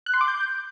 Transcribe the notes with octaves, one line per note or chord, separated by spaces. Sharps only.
F#6
C6
D6
G6